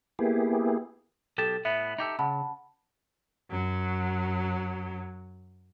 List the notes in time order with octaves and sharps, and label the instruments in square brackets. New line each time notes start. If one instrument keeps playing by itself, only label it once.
[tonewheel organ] A#3 B3 E4 G4 G#4
[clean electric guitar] B1 G4 A5 [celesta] A4
[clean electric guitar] A2 B3 [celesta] E5
[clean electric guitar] D#4 G4 A4
[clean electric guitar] C#3 [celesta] F#5 A5 B5
[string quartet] F#2 F#3